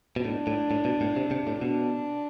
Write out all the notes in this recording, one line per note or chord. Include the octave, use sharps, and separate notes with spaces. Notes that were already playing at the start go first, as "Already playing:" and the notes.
B2
A2 D4
A2
A2
B2
A2
C3
C3
A2
B2 D4